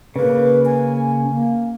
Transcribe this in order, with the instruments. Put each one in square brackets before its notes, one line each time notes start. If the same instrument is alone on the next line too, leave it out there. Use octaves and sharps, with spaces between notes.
[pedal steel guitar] C#3 A#3 [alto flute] B4
[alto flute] G#5
A#3